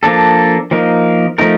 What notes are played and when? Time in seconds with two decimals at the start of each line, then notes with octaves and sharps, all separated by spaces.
0.03 F3 A#3 D4 A4
0.71 F3 A#3 D#4 A#4
1.38 F3 A3 D#4 A#4